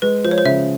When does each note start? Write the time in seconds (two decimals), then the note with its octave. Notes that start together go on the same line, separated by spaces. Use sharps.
0.02 G#3 B4
0.24 F3 C5
0.31 C#5
0.38 C5
0.45 C#3 E5